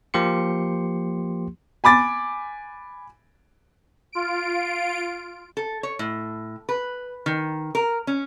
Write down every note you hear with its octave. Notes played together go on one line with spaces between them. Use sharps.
F3 A#3 G4 C6 C#7
G#5 B5 D6 A6
F4 D7
A4
C#5
A2
B4
D#3
A#4
C#4